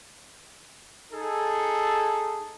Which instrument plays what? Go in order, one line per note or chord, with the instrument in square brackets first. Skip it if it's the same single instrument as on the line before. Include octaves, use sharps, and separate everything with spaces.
[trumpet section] D#4 G#4 A4